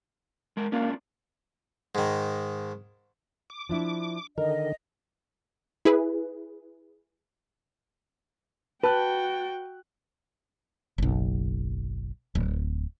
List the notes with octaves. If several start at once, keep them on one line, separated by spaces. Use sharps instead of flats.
G#3 A#4
A#3 C#4 D4 F4
G#2 D#3
D6
F3 D4 E4
D3 D#3 A#4 D#5
E4 G#4 B4
F#4 B4 G5 A5 F#6
F#1 B1
D1